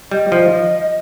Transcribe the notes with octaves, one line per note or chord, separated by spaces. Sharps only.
G3 D#5
F3